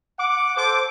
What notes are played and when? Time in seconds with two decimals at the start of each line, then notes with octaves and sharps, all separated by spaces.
0.19 F#5 D6
0.56 A4 C5 D6